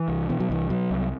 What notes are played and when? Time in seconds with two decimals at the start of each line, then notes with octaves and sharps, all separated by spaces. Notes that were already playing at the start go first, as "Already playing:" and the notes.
Already playing: E3
0.08 C2
0.29 B2 E3
0.40 F#3
0.49 C2 E3
0.70 B2 F#3
0.91 C2